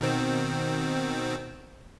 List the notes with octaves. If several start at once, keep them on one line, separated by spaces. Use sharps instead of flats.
B2 D#3 C4